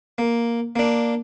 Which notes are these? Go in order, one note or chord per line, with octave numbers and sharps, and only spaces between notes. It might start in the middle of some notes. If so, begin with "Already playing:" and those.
A#3
A#3 D4